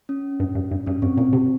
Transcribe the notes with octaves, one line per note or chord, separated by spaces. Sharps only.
C#4
G2
G2
G2
G2 C#4
G2 C4
A#2 C4
C3